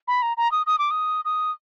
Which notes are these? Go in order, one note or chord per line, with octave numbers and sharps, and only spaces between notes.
B5
A#5
A#5
D#6
D#6
D6
D#6
D#6